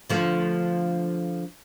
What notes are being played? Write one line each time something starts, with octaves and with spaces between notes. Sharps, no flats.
D3 F3 A3